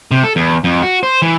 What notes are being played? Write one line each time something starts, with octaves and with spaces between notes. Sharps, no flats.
C3
A4
E2
F2
F#4
C5
E3